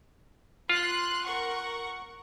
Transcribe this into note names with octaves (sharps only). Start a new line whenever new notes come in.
F4 C6 F#6
A#4 F#5 C#6